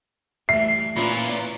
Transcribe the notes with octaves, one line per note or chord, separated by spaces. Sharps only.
E3 G3 A3 E5 C7
A#2 C#4 E4 F4 B4 B5